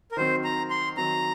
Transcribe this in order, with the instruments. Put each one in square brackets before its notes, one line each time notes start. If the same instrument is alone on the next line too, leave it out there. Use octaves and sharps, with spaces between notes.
[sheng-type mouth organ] A#4
[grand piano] D#3 F#3 C4 [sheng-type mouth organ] C5
[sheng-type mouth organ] A#5
C6
[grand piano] D#3 F#3 C4 [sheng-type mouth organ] A#5